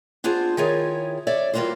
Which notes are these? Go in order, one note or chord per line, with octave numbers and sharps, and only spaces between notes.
B3 D4 F4 G#4 C5
D#3 E4 F4 G#4 C#5
C#5 D5 E5
E3 G3 A#3 F4 F#4 C5